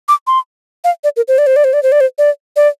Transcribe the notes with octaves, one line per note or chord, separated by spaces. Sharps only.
D6
C6
F5
D5
A#4
C5
D5
C5
D5
C5
D5
C5
D5
C5
D5
D5